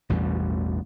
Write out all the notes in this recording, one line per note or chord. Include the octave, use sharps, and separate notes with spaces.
A1 E2 B2 G3